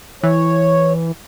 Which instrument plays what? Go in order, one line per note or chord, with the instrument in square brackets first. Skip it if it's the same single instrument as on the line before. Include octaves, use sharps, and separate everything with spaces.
[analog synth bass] E3 [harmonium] C#5